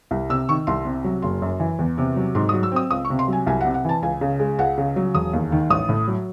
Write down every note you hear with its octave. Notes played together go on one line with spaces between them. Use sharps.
C2
C3 E6
D#3 C#6
C2 C6
C3
F#3
F#1 C6
F#2
E3
E2
C3
F#3
G#2 C6
D#6
F#3
E6
C4 D#6
C#2 D#6
C#6
C3
C6
F#3 G#5
C2 G#5
F#5
C3
F#5
E3 A5
C#2 G#5
C#3
G#3
C#2 F#5
C#3
F#3
E1 D#6
D#2
D#3
A1 D#6
A2
F#3